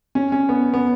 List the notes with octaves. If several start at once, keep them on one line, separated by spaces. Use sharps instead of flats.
C#4
C#4
B3
B3